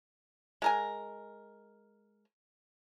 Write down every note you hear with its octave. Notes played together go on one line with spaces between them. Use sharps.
G#3 A#4 G#5